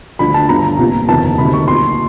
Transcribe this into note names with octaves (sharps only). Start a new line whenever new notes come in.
D2 D3 F3 B5
A5
G1 G2 D3 A#5
C2 A#2 F3
F#1 E2 C3 D#3 A5
D2 C3 D#3 B5
C#6
C2 A#2 F3 C6